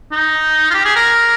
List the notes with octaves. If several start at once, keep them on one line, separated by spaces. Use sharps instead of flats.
D#4
F4
G4
G#4
A#4